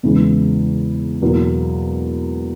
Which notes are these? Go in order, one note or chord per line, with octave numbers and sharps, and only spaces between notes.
E2 C#3 E3 G#3
E2 B2 F#3 A#3